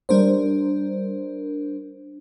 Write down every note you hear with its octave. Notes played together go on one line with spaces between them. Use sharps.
G3 D4 A#4 C5